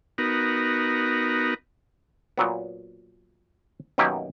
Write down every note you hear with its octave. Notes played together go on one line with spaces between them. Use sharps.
B3 D#4 F#4 A#4
A#2 F#3 B3
F#2 B2 D#3 F#3 A#3 G4